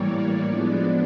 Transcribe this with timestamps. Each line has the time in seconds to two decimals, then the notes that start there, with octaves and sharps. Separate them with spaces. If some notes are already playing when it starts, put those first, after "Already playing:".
Already playing: A2 E3 G3 A#3 C#5 D5
0.45 F3 G#3 B3 D4